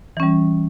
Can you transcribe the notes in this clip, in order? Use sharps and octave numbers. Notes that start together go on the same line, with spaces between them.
E3 G3 C#4